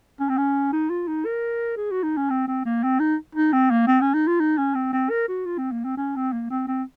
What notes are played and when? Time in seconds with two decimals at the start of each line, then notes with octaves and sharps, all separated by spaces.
0.20 C#4
0.29 C4
0.37 C#4
0.73 D#4
0.90 F4
1.08 D#4
1.25 A#4
1.77 G#4
1.91 F#4
2.03 D#4
2.17 C#4
2.30 C4
2.48 C4
2.65 A#3
2.83 C4
3.00 D#4
3.35 D#4
3.53 C4
3.71 A#3
3.87 C4
4.01 C#4
4.14 D#4
4.27 F4
4.40 D#4
4.58 C#4
4.75 C4
4.93 C4
5.10 A#4
5.28 F#4
5.46 F4
5.58 C4
5.72 A#3
5.84 C4
5.97 C#4
6.16 C4
6.33 A#3
6.50 C4
6.67 C4